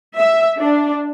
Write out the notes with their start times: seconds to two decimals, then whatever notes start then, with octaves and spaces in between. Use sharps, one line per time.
0.18 E5
0.60 D4